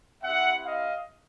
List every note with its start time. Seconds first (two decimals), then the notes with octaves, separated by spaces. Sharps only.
0.23 C4 E4 G4 E5 F#5
0.65 D#5 F5